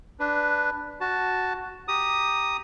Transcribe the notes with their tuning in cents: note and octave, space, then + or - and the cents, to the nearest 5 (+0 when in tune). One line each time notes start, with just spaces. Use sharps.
D4 +0 B4 +0
F#4 +0 A5 +0
G4 +0 A#5 +0 D#6 +0